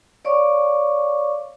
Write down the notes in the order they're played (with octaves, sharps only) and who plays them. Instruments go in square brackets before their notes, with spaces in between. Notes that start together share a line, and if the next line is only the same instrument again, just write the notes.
[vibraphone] C#5 D5 F5 C#6 D6